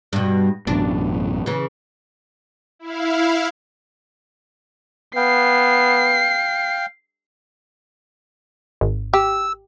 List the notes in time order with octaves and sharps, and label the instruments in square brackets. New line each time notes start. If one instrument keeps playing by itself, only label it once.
[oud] G2 B2
[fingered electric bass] A1 F#2 B2 [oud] D4
[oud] C#3 E3
[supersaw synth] E4 F5
[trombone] B3 [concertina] F5 G5 [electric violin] C7
[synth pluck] G#1
[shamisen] G4 [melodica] E6